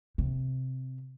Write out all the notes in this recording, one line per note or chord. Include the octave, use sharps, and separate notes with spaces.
C3